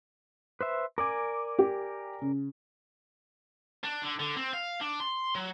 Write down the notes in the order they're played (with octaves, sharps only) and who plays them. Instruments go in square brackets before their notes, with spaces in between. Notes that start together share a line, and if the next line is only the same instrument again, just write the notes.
[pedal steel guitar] B4 C5 E5
[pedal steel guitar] A#4 D5 G#5 [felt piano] D6
[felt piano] G4
C#3
[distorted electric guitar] D4
D3
D3
C4
F5
D4
C6
F#3